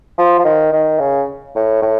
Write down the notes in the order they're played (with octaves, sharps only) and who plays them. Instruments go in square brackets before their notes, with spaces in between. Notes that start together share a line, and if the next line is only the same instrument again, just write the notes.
[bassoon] F3
F3
D#3
D#3
C#3
A2
A2